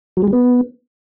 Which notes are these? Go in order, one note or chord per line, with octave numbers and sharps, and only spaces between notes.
F#3
G#3
G3
B3